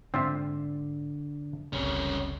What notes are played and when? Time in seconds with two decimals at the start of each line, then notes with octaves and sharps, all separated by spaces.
0.14 G#2 D3 C4 F4 E5
1.73 F#1 C#2 C3 G3 C#4